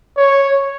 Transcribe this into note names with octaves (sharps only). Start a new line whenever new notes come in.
C#5